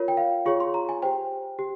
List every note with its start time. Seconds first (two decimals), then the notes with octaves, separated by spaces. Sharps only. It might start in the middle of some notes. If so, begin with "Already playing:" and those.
Already playing: F4 A#4 C#5
0.08 G5
0.17 F5
0.46 F4 G#4 C#5 C#6
0.60 C6
0.74 A#5
0.89 G#5
1.02 G4 C5 G5
1.59 G4